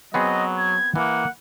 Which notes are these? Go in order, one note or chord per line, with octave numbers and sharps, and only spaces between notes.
F#3 B3 C4 G#4 D#5
G#6
E3 A#3 F#5